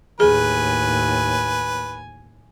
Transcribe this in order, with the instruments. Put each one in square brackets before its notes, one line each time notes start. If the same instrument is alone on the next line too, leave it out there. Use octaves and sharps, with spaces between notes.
[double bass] D#2 A2 [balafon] G#4 [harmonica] B4 [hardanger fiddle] G#5